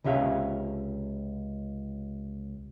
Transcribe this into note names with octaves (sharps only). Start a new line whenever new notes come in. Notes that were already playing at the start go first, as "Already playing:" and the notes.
C#2 C3 C#4 E5 F5